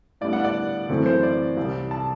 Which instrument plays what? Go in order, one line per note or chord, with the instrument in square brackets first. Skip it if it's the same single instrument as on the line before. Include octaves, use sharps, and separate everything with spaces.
[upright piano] A2 G3 B3 D4 D5
F#5
D5
F#2 E3 A3 C4
C5
D5
C2 C3 G3
A5